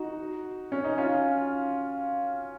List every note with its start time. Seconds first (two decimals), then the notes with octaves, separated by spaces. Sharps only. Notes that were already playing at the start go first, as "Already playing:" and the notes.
Already playing: D#4 F#4
0.72 C#4
0.84 D#4
0.98 C#4 F4